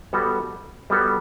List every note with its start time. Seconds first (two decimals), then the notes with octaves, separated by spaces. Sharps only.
0.13 G3 B3 F#4 A4
0.90 G3 B3 F#4 A4